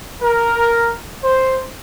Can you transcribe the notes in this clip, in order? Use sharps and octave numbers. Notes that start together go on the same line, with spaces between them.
A#4
C5